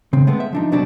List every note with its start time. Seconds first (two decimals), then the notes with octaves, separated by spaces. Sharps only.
0.13 C#3 C4
0.27 G#3 A3 B3 C4
0.40 E5
0.53 F3 D4 D#4
0.71 C2 B2 F#3 G3 C4 D5